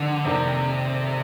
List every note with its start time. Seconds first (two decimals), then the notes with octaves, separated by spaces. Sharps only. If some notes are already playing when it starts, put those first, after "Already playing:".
Already playing: G#2 D3 F3 C4 D#4 A#4
0.25 F2 C3 D#3 A#3 D4